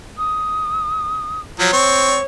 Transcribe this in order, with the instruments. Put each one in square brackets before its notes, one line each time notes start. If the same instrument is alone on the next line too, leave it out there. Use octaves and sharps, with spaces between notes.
[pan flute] D#6
[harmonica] F3 F#3 [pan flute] C#5
[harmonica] C4 C#6